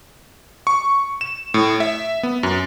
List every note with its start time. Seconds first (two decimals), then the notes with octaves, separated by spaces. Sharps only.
0.67 C#6
1.21 E7
1.54 A2
1.80 E5
2.23 B3
2.43 F#2